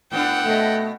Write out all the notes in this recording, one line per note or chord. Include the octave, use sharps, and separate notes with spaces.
A2 B3 D4 F#5 G5
B2 A3 B3 D#5